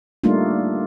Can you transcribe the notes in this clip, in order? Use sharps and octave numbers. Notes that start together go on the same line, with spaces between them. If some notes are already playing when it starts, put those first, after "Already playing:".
G3 A3 A#3 D4 D#4 F4